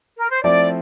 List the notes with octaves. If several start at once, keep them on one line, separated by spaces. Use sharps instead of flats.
A#4
C5
F3 A3 C4 E4 D5